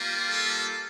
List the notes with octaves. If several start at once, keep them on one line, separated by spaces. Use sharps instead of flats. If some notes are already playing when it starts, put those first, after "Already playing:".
Already playing: G3 A#3 F4
A4